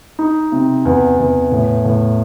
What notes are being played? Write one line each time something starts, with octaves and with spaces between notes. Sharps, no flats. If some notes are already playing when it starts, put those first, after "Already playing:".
D#4
C3
E2
E2
A2
A2